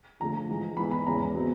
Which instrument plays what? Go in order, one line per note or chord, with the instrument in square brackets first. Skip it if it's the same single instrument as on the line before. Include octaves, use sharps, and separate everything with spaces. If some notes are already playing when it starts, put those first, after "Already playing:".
[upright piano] F2 D3 F3 A3 A#5
G#2 E3 G#3
G#2 E3 G#3 B3 B5
B5
E2 C#3 E3 A#5
B2 G#3 C4